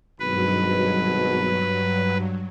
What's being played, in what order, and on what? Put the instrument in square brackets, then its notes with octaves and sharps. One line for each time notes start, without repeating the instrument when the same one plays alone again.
[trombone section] G#1 B2 [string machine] G2 F#3 [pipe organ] B4